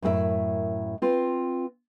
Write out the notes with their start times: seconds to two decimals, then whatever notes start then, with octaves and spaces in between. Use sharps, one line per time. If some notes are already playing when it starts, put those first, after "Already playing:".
0.02 F#2 A2 E4 G#4 A#4 E5
1.02 C4 F4 B4